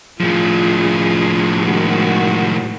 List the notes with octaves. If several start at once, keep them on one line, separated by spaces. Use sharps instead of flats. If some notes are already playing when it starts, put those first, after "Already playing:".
A2 F3 F4 G#4
D#3 G#3 F#4